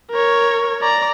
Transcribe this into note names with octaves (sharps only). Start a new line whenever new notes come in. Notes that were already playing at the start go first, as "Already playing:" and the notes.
A#4 C#5
D5 A#5